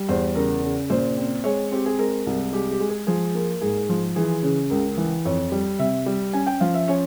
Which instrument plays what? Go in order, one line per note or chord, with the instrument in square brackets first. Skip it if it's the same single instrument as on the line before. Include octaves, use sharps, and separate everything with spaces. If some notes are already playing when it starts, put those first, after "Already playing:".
Already playing: [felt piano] G3
E2 C5
C#3 A#4
C#3
A#2 C5
C4
G#3 C#5
C4 G4
G#4
G#3 A#4
C2
G#3 G4
G4
G#3
G#4
F3 G#4
A#3
G#2 G#4
F3
E3 G#4
C#3
C#2 A#4
E3
F2 C#5
G3
C3 E5
G3
C#4 G#5
G5
F3 F5
E5
C#4 C#5